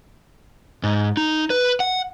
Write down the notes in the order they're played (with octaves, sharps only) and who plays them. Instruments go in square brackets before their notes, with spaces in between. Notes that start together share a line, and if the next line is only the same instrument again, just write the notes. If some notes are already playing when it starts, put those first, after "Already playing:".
[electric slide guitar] G#2
D#4
B4
F#5